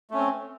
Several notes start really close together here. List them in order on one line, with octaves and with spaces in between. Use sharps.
A3 C#4 C4